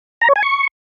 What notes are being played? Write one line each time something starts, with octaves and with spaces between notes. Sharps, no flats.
A#5
C#5
G#5
C#6